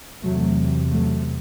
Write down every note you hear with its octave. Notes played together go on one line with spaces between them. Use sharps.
E2 C3 F#3 A3
F#3 A3